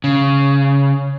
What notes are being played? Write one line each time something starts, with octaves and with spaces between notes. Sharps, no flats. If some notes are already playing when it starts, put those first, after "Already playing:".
C#3